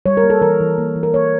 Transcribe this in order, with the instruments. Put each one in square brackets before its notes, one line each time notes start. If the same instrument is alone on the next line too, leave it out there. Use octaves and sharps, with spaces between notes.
[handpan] G3 C#5
A#4
A#3
A4
E3 A#4
E3
A#3
E3
A#4
A#3 C#5